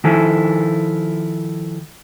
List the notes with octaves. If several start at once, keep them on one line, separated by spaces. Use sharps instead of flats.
D#3 F3 E4 A4 G#5